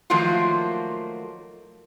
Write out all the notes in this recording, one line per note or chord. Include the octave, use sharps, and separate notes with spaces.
D#3 F3 F#3 A3 A#3 F4